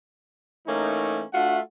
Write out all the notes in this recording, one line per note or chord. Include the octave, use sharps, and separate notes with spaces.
E3 A3 A#3 C#4 D#4
A3 D4 F4 F#4 E5 F#5